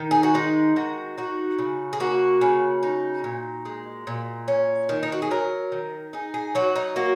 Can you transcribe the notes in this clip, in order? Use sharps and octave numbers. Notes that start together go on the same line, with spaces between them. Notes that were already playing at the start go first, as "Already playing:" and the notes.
Already playing: D#3 D#4
G#4
F#4
G#3 D#4
D#3 F#4
D#4 F#4
C#3
G#4
A#3 F#4
C#3
D#4
A#2
G#3
A#2
C#4
D#3
D#4
F#4
G#4
F#3 A#4
D#3
D#4 G#4
G#4
F#3 F#4
D#4
A#3 F#4